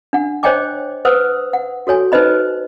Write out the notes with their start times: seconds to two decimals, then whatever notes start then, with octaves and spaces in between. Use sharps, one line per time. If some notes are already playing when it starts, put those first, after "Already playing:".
0.13 D4 F#5
0.43 C5 C#5 D#5 G5 G#5 D6
1.05 B4 C5 F#5 D#6 E6
1.53 F#5
1.87 F#4 A4 C#5 G#5
2.12 D#4 B4 C5 D#5 B5